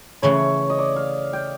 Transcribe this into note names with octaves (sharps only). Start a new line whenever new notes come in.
C#3 E3 A3 C#5
D#5
D5
F5
G5